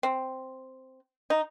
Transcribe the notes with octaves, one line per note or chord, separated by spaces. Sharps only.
C4
D#4